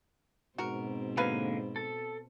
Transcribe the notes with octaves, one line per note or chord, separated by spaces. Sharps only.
G#2 B2 C4 F#4 A#4
D3 F#3 A#3 B4 F5 G#5
A4